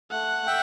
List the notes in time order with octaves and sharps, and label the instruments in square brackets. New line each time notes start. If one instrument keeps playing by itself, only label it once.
[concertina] A3 [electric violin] F#5
[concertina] E5 G5